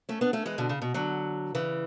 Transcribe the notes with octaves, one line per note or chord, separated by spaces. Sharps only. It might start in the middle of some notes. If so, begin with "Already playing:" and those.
A3 C#4
B3 D4
A3 C#4
E3 G#3
B2 D3
C#3
B2
D3 F#3
C#3 E3